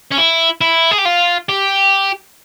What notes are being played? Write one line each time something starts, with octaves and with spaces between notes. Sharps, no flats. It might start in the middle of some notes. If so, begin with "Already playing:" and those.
C#4
E4
E4
G#4
G4
F4
G4